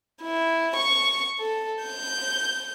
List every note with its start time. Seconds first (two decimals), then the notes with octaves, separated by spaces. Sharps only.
0.22 E4
0.76 C#6
1.39 A4
1.84 G6